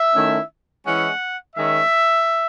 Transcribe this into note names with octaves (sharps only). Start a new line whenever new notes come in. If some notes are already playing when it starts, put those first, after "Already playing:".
Already playing: E5
D#3 A3 C#4 E4
E3 G#3 C#4 E4 F#5
D#3 G#3 C#4 E5